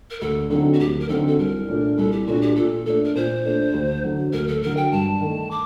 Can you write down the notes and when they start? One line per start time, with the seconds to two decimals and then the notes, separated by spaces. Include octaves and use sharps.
0.11 A#4
0.21 D2 A4
0.50 D3 F#3 C4 D#4 A4
0.73 F#4
0.79 D2 G4
1.00 A#4
1.09 D3 F#3 C4 D#4 A4
1.28 A4
1.38 C2 A#4
1.68 A#2 A3 D4
1.97 C2 A4
2.12 G4
2.27 A#2 A3 D4 F#4
2.42 G4
2.56 A#2 A4
2.86 A3 D4 A4
3.04 A#4
3.15 A#2 C5
3.45 A3 D4
3.74 D2
4.04 D3 F#3
4.33 D2 A#4
4.48 A4
4.62 D3 F#3 A#4
4.77 G5
4.92 G2 A5
5.21 D#3 A3
5.51 D6